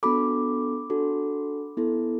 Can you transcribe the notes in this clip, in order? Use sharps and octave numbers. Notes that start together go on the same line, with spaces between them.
B3 D4 F#4 A4 B5 D6
D4 F#4 A4
B3 E4 A4